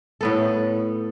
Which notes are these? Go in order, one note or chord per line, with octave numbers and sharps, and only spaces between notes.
A2 B3 A4